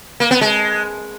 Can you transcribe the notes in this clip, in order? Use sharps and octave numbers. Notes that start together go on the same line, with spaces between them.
A#3
B3
G#3